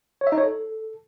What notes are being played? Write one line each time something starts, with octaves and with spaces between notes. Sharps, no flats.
C#5
E5
D#4
C#5
A4